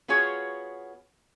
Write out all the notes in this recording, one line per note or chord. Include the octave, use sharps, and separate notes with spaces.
B3 F4 F#4 G#4 C#5